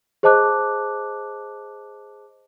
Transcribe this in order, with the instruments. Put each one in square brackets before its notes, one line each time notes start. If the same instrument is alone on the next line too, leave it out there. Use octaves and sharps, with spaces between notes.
[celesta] G#4 C5 D#5 A5 D6 F#6